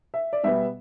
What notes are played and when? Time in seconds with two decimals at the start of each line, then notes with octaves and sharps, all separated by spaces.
0.14 E5
0.33 D5
0.43 B2 G3 B3 E5